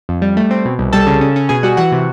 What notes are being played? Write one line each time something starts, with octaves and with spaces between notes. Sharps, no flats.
F2
G3
A3
C4
B2
C2
G3 A4 A5
C#3
C#4
C#4
B2 G#4 G#5
G3 F#4 F#5
E3 F#4 F#5
C3